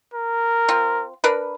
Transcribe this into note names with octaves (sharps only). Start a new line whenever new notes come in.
A#4
C4 F4
D4 A#4 B4